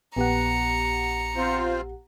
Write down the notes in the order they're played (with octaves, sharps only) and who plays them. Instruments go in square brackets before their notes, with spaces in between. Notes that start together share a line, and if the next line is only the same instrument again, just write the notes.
[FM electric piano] A#1 G4 F#5 [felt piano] B3 [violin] A#5 C#7
[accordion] C4 F4 C5